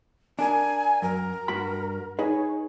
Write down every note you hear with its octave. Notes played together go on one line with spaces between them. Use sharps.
D4 A#4 G#5
F#2 A#4
G2 F#4 B5
D#4 G#4 B4 C#5